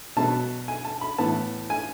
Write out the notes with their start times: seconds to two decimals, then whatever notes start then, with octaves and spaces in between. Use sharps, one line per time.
0.17 B2 F#3 B3 A5
0.68 G#5
0.85 A5
1.01 B5
1.18 A2 E3 B3 A5
1.70 G#5